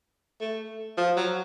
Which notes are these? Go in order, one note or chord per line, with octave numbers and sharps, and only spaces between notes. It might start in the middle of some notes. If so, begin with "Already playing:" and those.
A3
F3
F#3